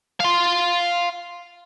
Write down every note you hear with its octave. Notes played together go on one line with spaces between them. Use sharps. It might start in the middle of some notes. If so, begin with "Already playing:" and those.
F5 C6